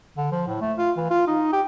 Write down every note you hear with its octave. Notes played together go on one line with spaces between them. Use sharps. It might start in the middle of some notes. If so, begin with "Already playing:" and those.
D3
F3
A2
A3
F4
E3
F4
D#4
G4